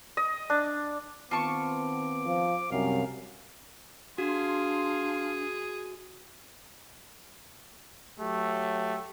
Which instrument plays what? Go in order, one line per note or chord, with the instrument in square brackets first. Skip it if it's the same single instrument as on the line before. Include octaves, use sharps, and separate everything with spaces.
[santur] D#5
D4
[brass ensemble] D#3 B3 C4 [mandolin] F4 A5 C#6 [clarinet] D6
[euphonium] F3
[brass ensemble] C2 C3 [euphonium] F#2 [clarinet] F5
[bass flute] D4 [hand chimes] F#4 [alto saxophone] G#4 [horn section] F5 C6
[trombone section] F#3 G4 [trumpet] A3